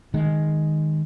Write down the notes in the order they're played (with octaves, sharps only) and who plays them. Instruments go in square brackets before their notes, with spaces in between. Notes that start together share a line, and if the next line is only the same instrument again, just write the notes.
[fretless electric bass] D#3 G#3